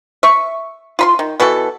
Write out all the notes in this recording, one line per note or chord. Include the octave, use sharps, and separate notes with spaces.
E5 C#6
F4 B5 C6
D#3
B2 E3 F#4 A4